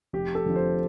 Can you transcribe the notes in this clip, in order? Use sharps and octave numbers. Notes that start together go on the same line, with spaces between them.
F1 G4
A4
F2 D3 F3
C5